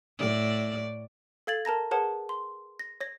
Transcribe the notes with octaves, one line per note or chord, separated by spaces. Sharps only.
A2 D5
A4 F5 G#6 A6 F#7
A#4 A5 A#5 A#6
G#4 A#4 B4 C#5 F#5 A5
C6
A#6
C#5 A#6